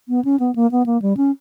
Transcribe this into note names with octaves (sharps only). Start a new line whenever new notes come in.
B3
C#4
B3
A#3
B3
A#3
G3
C#4